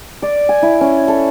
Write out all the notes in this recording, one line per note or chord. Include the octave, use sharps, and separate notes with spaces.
D5
G#5
E4
C#4
A4